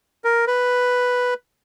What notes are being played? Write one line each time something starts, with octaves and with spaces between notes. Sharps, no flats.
A#4
B4